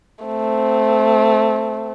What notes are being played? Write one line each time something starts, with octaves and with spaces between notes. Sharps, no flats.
A3 C4